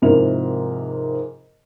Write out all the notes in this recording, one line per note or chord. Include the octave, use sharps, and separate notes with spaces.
G#2 C3 F3 E4 A#4 F7